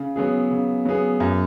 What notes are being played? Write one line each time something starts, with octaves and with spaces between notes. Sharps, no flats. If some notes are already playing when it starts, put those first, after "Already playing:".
Already playing: C#3
F#3 B3 G#4
C#3
F#3 B3 G#4
F#2